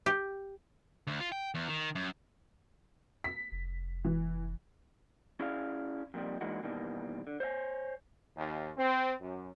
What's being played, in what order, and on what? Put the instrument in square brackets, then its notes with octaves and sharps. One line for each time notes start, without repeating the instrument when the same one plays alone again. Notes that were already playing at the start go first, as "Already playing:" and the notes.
[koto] G4
[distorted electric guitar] D2
F4
G5
E2
D#3
F#2
[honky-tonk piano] B6
[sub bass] F1
[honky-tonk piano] E3
[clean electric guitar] C#4 E4 G#4 D5 F5
F2 A#2 D#3 G3
E3 G#3 A#3 D4 D#4 F#4
B2 D#3 E3 G3 A#3
D3
C5 C#5 E5 G#5
[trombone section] D#2
C4
F#2